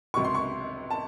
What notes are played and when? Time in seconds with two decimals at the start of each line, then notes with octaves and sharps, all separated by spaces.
0.14 C#2 C3 F#3 C#6
0.24 C6
0.35 C#6
0.91 A5